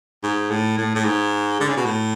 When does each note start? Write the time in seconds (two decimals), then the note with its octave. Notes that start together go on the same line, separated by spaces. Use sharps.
0.23 G#2
0.50 A2
0.78 A2
0.95 A2
1.05 G#2
1.60 D3
1.68 C#3
1.77 B2
1.86 A2